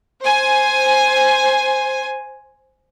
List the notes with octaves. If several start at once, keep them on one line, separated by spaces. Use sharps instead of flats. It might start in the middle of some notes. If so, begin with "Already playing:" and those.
C5 G#5